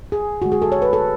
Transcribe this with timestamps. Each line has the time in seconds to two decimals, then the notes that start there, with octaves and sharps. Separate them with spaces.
0.12 G#4
0.42 D3 G#3 F#4
0.52 G#4
0.62 A4
0.72 C#5
0.82 B4
0.93 A4